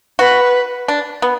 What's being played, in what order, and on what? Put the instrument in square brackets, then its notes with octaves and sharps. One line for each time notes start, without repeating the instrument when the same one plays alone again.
[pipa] F#4 [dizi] B4
[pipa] D4
B3